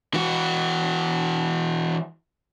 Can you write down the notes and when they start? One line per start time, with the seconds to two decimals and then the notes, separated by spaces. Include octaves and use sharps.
0.14 E3 F#4